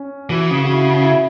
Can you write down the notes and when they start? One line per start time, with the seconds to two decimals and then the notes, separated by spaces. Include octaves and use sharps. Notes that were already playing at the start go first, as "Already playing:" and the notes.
Already playing: C#4
0.29 E3 F#4
0.51 C#3
0.65 F#4
0.73 E4
0.89 F#4
1.03 E4